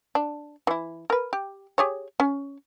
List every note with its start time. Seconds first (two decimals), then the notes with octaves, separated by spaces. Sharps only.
0.15 D4
0.67 E3 E4
1.10 A#4 B4
1.33 G4
1.78 G4 G#4 C#5
2.20 C#4